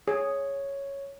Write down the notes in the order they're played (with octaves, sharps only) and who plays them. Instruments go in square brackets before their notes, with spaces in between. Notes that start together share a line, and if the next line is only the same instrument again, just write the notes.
[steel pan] G#4 [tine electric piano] C#5